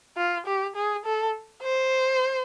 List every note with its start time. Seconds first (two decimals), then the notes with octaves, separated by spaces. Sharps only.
0.17 F4
0.46 G4
0.76 G#4
1.05 A4
1.63 C5